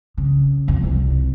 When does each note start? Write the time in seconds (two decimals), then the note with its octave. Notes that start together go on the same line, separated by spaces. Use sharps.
0.17 C#3
0.68 C2 F2
0.84 C2